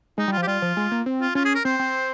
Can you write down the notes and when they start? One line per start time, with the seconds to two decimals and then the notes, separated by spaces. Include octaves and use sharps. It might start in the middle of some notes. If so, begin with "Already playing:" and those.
0.18 G#3 D#4
0.28 G3
0.32 F4
0.37 F3
0.42 G4
0.47 G3 F4
0.62 F3
0.77 G#3
0.92 A#3
1.06 C4
1.21 F4
1.35 C#4 F4
1.45 G#4
1.55 A#4
1.65 C4 C5
1.79 C4